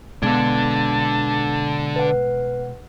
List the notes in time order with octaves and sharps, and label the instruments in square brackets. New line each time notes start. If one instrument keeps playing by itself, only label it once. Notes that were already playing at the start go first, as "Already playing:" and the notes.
[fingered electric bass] B2 G#3 [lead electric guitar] D3 D4 [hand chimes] B3 G#6 [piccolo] A5
[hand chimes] B4 F#5